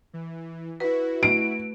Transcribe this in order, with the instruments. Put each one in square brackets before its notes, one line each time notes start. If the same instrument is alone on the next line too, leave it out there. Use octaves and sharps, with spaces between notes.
[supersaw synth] E3
[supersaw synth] E4 F#4 [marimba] B4
[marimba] A3 [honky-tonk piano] D7